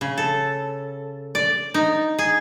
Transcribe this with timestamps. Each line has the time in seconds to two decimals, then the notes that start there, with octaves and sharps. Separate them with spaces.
0.01 C#3
0.18 A4
1.35 D5
1.74 D#4
2.19 G#4